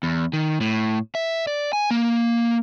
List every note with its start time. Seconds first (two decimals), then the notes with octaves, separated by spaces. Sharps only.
0.03 E2
0.33 D#3
0.61 A2
1.15 E5
1.47 D5
1.73 G#5
1.91 A#3